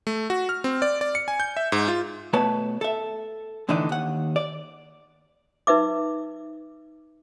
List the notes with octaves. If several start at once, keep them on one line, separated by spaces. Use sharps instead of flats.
A3
F#4
F6
C4
D5
D5
C#7
G#5
G6
E5
G#2
F4
B2 A3 B4 C#5 A5
A4 E5
A2 D3 E3 D4 D#4
D#2 F#5
D5
D#4 B4 E5 D6